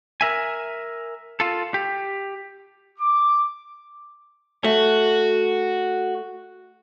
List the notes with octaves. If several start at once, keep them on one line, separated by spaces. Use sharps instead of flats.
A#4 E5 G#5
F4 A4
G4
D6
A3 F#4